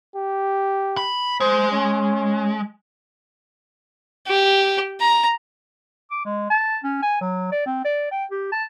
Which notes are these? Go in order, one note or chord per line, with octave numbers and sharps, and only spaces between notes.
G4
B5
G#3 C5
C#4
G4
A#5
D6
G#3
A5
C#4
G#5
F#3
D5
C4
D5
G5
G4
A5